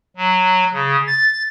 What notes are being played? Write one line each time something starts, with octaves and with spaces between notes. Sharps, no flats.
F#3
C#3
A6